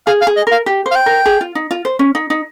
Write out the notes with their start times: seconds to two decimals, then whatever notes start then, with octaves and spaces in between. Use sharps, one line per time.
0.07 G#4 F5
0.22 F5
0.27 G#4
0.37 D#5
0.47 A#4 F5
0.66 G4
0.86 C5
0.91 F5
0.96 G5
1.06 A#4
1.26 G#4
1.41 F4
1.55 D#4
1.71 F4
1.85 C5
1.99 C#4
2.15 D#4
2.30 D#4